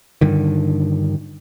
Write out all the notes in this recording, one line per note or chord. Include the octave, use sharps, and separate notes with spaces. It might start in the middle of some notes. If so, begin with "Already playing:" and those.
G2 D3 D#3